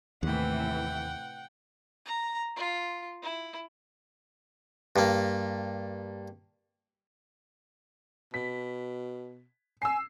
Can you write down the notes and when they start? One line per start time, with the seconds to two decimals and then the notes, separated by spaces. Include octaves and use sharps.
0.23 D#2 A2 C3 E3 F#5 G5
2.05 A#5
2.56 F4
3.22 E4
4.96 G2 A#3
8.34 B2 B6
9.82 G#5 E6 C7